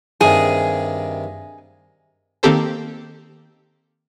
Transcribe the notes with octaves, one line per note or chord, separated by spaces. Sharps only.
G2 C3 D#3 G#4
D#3 A#3 C4 G4 A4 C5